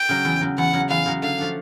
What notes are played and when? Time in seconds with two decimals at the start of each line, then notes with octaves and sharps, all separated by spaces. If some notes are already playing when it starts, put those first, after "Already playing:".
Already playing: G5
0.09 C#3 F#3
0.25 E2
0.41 C#3 F#3
0.58 E2 F#5
0.73 C#3 F#3
0.89 E2 F5
1.06 C#3 F#3
1.22 D3 F5
1.38 F3 A3 D4